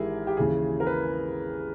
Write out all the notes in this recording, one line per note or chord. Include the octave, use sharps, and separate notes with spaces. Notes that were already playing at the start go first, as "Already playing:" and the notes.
Already playing: G#1 G#2 E3 E4 G4 G#4 A#4
G4
D#2 C#3 E3 G#4
A#4
B4